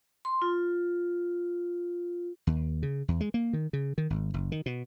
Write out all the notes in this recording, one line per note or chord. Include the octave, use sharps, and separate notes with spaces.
C6
F4
D#2
C#3
E2
G#3
A#3
D#3
C#3
D#3
G#1
F#1
D#3
B2